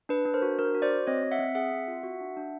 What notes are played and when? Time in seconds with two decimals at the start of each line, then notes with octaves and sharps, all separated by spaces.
0.09 D4 B4
0.25 D4
0.34 A#4 C5
0.42 F#4
0.59 D4 A#4
0.75 F#4
0.82 C5 D5
0.91 F#4
1.07 C4 C#5 D#5
1.23 C4
1.31 E5 F#5
1.39 C4
1.55 G#4 E5 F#5
1.72 C4
1.88 F4
2.03 F#4
2.20 D4
2.37 D4